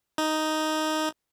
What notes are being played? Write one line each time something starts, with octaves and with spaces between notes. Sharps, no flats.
D#4